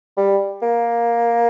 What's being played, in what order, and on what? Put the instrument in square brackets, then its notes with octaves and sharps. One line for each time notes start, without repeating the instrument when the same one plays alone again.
[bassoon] G3
A#3